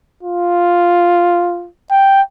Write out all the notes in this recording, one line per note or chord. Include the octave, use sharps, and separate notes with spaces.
F4
G5